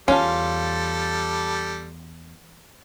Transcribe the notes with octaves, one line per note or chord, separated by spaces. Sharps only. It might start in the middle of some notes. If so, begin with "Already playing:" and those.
E2 G3 C#4 F4 A4 A5